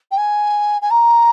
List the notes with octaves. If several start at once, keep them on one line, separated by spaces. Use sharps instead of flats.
G5
G#5
G#5
A#5